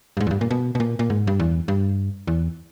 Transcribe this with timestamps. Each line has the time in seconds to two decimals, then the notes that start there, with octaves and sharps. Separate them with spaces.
0.17 G2
0.20 G#2
0.27 E2
0.31 G2
0.41 A#2
0.51 B2
0.75 B2
0.80 A#2
0.99 A#2
1.10 G#2
1.27 G2
1.40 E2
1.68 G2
2.27 E2